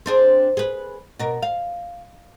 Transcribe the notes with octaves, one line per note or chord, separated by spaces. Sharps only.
C4 D4 G#4
G#4 B4
B2 A#4
F5